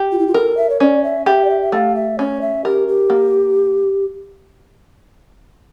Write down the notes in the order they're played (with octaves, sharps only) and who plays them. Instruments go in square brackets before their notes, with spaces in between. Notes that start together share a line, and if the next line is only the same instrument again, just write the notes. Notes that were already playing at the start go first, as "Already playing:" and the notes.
Already playing: [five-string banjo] G4
[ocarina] F4
E4
F4
[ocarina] A4 [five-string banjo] A#4
[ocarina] E5
C#5
[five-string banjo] C#4 [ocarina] D5
[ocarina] E5
[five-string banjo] G4 [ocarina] E5
[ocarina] D5
E5
E5
[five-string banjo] A3 [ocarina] F5
[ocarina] E5
[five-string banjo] C#4 [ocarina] C#5
[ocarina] E5
[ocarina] G4 [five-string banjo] A#4
[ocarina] G4
[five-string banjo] A#3